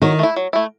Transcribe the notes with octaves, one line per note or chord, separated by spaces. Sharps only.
D#3 F#3
A3 E4
F#3
A3 E4